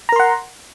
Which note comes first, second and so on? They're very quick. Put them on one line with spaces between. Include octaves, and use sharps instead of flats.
A#5 A#4 C6 F#5